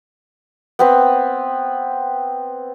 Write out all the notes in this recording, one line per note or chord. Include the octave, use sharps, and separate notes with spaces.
B3 C4 B4